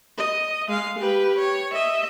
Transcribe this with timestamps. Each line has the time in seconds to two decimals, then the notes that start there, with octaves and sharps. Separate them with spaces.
0.18 D#5
0.68 G#3 F5
0.99 G4 B4
1.38 C#5
1.74 D#5 E5